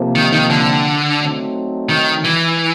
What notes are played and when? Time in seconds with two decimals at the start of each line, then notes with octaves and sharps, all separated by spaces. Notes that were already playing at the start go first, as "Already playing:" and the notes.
Already playing: C3 F3 A#3
0.15 D#3
0.32 D#3
0.50 D3
1.20 F#3 A3 C4 D#4
1.89 D#3
2.24 E3